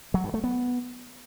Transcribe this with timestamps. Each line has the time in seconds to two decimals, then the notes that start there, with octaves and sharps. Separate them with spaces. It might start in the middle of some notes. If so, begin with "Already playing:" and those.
0.14 F#3
0.24 G2
0.34 A3
0.44 B3